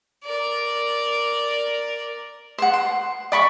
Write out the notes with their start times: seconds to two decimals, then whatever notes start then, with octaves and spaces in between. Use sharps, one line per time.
0.24 A#4 D5
2.58 C5 F#5
2.73 C6
3.32 D5 B5 C#6